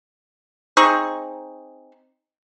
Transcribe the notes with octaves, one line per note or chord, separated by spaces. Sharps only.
C4 D#4 G#4 C#6